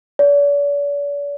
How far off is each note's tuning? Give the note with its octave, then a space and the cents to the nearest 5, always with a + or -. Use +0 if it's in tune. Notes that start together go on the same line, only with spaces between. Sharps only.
D5 -45